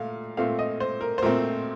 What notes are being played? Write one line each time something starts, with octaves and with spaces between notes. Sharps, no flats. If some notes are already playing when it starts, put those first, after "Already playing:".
Already playing: A#2 A3 F5
A#2 A3 C4 F5
D#5
C5
A#4
C5
A#2 A3 C4 A#4